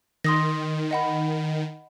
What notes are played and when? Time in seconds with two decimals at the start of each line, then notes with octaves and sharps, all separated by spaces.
0.24 D#3 C6 D#6 A#6
0.91 D#5 F#5 B5